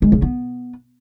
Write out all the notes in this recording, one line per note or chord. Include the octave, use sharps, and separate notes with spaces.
G#3
C#3
B3